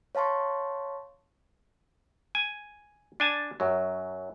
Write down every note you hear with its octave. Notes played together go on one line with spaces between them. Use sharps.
C#5 F5 A5 C6 C#6
G#5
D4 G#5 A5
F#2 F#3